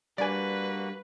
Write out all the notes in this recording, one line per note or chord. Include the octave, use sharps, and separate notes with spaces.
G3 A#3 D4 F#4 B4 D5 G#5